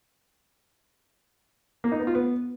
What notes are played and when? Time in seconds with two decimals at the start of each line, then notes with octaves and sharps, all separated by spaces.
1.84 A#3
1.92 D#4
1.99 B3
2.07 F4
2.15 B3